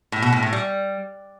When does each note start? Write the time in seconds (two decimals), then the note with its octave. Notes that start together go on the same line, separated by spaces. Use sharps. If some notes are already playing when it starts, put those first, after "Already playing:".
0.12 A2
0.22 B2
0.32 A2
0.43 A2
0.53 G3